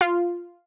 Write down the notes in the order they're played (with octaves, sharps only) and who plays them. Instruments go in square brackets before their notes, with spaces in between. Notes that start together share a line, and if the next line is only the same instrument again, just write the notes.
[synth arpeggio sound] F4